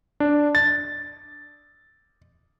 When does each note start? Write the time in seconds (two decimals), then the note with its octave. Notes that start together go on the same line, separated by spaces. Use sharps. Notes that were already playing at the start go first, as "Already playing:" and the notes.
0.20 D4
0.55 A6